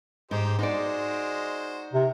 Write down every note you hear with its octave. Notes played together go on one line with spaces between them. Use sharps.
G#2 D#4 G4 C5
G#3 D#4 F#4 C5 D5
C3 A#4